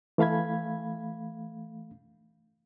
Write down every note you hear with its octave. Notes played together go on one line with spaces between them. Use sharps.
E3 A3 F5 B5 G#6